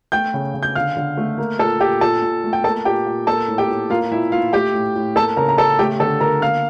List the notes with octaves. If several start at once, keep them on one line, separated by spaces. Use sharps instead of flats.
A3 G5 G6
C#3
C#3
G6
D3 F5 F6
D3
A3
A#3
A#2 A4 A5
A#2 G4 G5
A#2 A4 A5
A#2
A3
G5
A#3 A4 A5
A#2 G4 G5
A#2
A#3 A4 A5
A2
G4 G5
A2
A#3 F4 F5
A#2 E4 E5
A#2 F4 F5
A3 G4 G5
A2
A2
A#3 A4 A5
C#3 A#4 A#5
A#5
C#3 A4 A5
A3 G4 G5
D3 A4 A5
D3 A#4 A#5
A#3 F5 F6